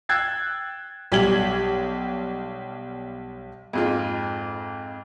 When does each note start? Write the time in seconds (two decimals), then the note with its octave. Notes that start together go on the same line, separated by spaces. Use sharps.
0.09 G5 E6 F#6 G#6 A6 C7
1.12 B1 G3 G4 G#6 F#7
3.73 F2 G#2 F4